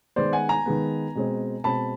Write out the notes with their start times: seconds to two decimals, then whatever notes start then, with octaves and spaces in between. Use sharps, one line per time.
0.16 D#3 G#3 B3 C5 D5
0.33 F#5 G#5
0.49 G#5 A#5
0.66 D#3 G#3 B3
1.15 B2 G#3 C4
1.64 B2 G#3 C4 A5 B5